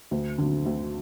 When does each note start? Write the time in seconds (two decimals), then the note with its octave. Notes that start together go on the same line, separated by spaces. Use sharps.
0.11 D2
0.38 D3 F#3
0.66 D2